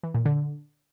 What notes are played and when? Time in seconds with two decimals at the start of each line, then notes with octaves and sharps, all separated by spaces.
0.03 E3
0.14 A#2
0.26 D3